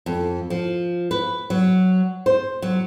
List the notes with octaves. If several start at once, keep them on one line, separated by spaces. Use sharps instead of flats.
F2
F3
B4
F#3
C5
F#3